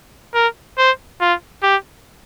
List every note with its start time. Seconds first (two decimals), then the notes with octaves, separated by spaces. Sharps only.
0.34 A#4
0.78 C5
1.21 F4
1.63 G4